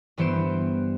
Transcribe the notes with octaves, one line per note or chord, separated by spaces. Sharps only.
G2 E3 B3 C5 D7 E7